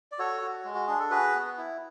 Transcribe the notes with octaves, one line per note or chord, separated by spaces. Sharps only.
D5
F#4 A4 C#5
F#4
G#3
F#4
D4 G#4
A4
F#4 G#4 B4
B3
E4